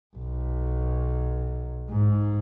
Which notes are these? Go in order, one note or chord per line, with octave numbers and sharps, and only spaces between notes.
B1
G#2